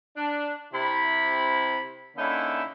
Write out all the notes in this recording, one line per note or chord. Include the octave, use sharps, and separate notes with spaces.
D4
C3 E4 B5
D3 A#3 C#4 D#4 E4